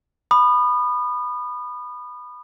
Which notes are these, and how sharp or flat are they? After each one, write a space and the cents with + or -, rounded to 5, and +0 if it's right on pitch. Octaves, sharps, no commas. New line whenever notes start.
B5 +0 D#6 -35